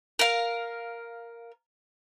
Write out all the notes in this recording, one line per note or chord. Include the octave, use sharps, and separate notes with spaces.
A#4 F5